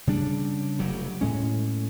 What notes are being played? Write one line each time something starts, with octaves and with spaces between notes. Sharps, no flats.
C#3 G3 D4
F1 F#3 G3
A2 G#3 C#4